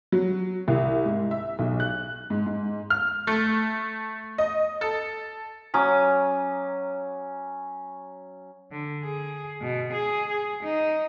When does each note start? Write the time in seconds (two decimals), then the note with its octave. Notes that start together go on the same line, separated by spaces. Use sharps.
0.12 F#3
0.68 C2
1.06 G#2
1.31 E5
1.59 B1
1.80 F#6
2.30 G#2
2.46 G#2
2.90 F6
3.27 A3
4.38 D#5
4.81 A4
5.74 F#3 C#4 D6 D#6
8.71 D3
9.04 G#4
9.61 B2
9.93 G#4
10.29 G#4
10.63 D#4